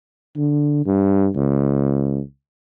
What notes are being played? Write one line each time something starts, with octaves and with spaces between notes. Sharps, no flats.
D3
G2
C#2